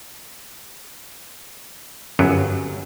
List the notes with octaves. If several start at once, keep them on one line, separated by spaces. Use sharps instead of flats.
G1 F#2 F#3